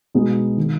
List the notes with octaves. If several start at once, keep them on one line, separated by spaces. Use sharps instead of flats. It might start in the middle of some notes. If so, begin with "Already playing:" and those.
B2 G#3 B3 D#4
D#3